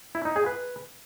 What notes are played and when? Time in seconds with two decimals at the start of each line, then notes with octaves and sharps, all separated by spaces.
0.15 E4
0.25 D#4
0.36 G#4
0.46 B4